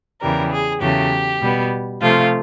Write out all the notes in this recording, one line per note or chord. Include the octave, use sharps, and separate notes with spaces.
E2 C#3 E3 G3 A#4
G#4
E2 C#3 F#3 A3 G4
B2 G3 B3
C3 F3 A3 F4